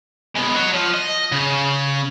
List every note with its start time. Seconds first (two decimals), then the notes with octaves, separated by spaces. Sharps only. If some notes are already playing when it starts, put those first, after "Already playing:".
0.36 G#3 B3
0.56 F#4 C#5
0.74 F3
0.94 D#5
1.32 C#3